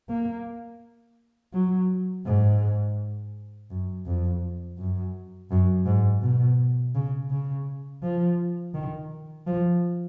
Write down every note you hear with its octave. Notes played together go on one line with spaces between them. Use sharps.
A#3
F#3
G#2
F#2
F2
F#2
F#2
G#2
B2
C#3
C#3
F3
D#3
F3